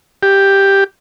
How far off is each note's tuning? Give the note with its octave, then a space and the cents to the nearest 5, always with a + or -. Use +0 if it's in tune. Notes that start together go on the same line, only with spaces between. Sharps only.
G4 +5